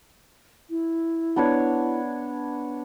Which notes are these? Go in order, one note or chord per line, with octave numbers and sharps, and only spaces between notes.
E4
B3 D4 C#5